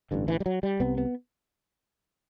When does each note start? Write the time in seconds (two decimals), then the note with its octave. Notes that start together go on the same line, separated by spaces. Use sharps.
0.11 A1 G2 D3
0.28 E3
0.40 G3
0.46 F#3
0.63 G3
0.80 C2 C3 B3
0.98 B3